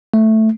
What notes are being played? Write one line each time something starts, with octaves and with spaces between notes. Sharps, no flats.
A3